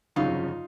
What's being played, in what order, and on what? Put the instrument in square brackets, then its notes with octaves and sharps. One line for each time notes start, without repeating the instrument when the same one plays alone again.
[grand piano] G1 F2 C#3 F#3 [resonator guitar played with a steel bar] D#4 F4